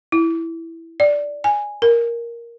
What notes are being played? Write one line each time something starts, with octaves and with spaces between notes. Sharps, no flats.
E4
D5
G#5
A#4